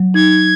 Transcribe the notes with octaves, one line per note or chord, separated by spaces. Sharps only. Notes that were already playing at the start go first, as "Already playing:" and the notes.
Already playing: F#3
D#4 G#6